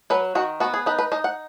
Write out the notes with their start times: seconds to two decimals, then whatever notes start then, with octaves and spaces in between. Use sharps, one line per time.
0.10 F#3 B4
0.35 D#3 F#4
0.60 B3 F#4
0.74 G#4
0.86 D#4 B4
0.99 B4
1.12 D#4 D#5
1.24 F#5